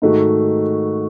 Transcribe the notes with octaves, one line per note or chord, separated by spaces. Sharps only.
G#2 D#3 A3 D#4 F#4